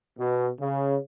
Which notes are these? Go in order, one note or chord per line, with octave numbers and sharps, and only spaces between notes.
B2
C#3